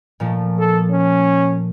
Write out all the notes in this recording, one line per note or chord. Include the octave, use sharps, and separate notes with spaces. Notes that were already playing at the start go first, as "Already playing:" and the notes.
A#2 F3 A3
A4
C#4